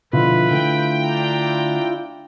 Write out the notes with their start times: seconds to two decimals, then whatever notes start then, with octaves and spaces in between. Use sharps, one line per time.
0.13 B2 D3 F3 E4 F4 B4
0.51 D3 A3 G5
1.05 D4 A#5